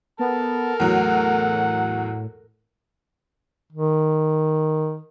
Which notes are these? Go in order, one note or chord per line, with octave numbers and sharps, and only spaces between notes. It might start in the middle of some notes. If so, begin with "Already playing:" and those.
B3 A4 A#4 A5
E2 A2 F#3 F#5
D#3